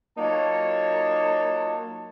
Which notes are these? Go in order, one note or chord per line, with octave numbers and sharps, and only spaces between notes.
F#3 A#3 D#4 F4 C#5 A5